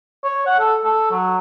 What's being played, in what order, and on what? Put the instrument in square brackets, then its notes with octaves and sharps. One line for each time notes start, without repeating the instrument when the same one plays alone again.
[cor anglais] C#5
F#5
A4
A4
F#3